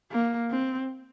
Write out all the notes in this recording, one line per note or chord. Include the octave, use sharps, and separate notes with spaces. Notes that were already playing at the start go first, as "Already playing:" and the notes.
A#3
C4